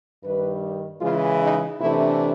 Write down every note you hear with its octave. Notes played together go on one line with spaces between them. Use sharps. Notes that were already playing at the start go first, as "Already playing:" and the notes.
G2 D#3 G3 B4
C#3 E3 G#3 F4
D#4
C3 E3 A3 D4 E4